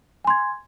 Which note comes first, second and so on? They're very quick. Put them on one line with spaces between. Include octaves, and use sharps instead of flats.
G#5 C6 G#6